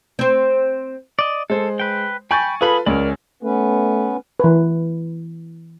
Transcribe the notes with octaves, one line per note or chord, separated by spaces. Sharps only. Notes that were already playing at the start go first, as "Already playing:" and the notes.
C4 C5
D5 D#5
G#3 A4 C5
B4 G5
G5 G#5 B5 C#6 G6 A6
F4 G#4 A4 B4 B5
C#2 C#4 A#4 D5
A3 B3 C#4 B4
E3 B4